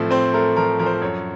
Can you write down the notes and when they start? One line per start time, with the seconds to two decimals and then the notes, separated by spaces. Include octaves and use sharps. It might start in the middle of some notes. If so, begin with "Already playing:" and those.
Already playing: A2 F3 A3 C4
0.11 C4 C5
0.34 A3 A#4
0.56 F3 A#4
0.79 F3 A#4
0.86 C5
0.93 A#4
1.02 F#2 C#5